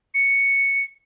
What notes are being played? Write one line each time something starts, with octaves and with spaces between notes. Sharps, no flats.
C#7